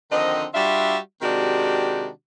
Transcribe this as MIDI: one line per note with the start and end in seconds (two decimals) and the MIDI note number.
0.12 0.45 50
0.12 0.45 51
0.12 0.45 53
0.12 0.45 60
0.12 0.45 75
0.54 0.96 55
0.54 0.96 62
0.54 0.96 65
0.54 0.96 66
0.54 0.96 76
1.22 2.09 48
1.22 2.09 51
1.22 2.09 56
1.22 2.09 62
1.22 2.09 66
1.22 2.09 67